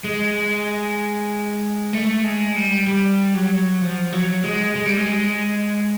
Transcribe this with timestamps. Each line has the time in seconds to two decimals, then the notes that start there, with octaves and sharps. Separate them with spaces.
0.04 G#3
1.93 A3
2.24 G#3
2.56 G3
2.87 G3
3.34 F#3
3.82 F3
4.13 F#3
4.44 G#3
4.76 G#3
4.86 G3
4.97 G#3